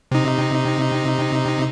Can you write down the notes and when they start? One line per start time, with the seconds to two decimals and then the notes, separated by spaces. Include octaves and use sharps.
0.11 C3 D#4